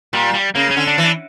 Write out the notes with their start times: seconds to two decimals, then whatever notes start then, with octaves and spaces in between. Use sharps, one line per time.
0.13 A#2 G3
0.34 G3
0.55 C#3 A#3
0.71 C#4
0.77 D3
0.87 D4
0.98 E3
1.04 D4